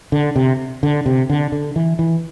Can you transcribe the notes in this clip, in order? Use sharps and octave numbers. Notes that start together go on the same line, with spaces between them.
D3
C3
D3
C3
D3
D3
E3
E3